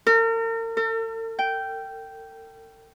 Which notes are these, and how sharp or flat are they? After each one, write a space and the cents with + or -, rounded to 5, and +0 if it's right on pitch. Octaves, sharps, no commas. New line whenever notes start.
A#4 -40
A4 +45
G5 -10